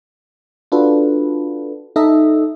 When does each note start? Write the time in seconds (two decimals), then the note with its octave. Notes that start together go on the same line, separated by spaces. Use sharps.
0.72 D4 F4 F#4 A4 B4
1.96 D#4 A4 D#5 E5